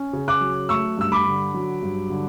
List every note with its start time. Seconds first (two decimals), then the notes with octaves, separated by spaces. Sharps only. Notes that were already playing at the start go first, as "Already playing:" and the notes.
Already playing: C#4
0.13 C#3
0.28 D6 F#6
0.41 F#3
0.69 A3 C#6 E6
0.97 G2 E6
1.12 B5 D6
1.26 D3
1.54 F#3
1.83 G2
2.10 D3